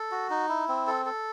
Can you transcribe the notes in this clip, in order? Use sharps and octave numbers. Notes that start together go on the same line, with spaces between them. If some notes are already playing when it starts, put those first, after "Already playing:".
Already playing: A4
F#4
D#4
E4
C4
A4
A4